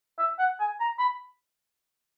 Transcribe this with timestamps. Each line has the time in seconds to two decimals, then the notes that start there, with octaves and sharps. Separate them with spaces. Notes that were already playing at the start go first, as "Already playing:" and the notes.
0.19 E5
0.39 F#5
0.60 G#5
0.80 A#5
0.99 B5